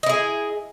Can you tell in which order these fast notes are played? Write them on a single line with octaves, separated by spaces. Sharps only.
D#5 E4 G#4